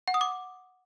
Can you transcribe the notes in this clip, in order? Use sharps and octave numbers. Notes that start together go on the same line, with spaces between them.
F#5
D#6
D6